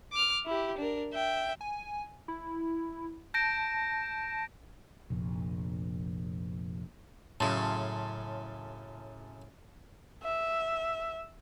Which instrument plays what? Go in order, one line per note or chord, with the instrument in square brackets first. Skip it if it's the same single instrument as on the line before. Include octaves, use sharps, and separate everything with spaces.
[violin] D6 F6
E4 G4
D4 A#4
E5 G5
[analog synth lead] G#5
E4
[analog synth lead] A5 [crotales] G6 A#6 D7
[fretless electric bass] F1 A#1
[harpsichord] F#2 C#3 [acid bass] A2 [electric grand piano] A5 C6 A6
[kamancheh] E5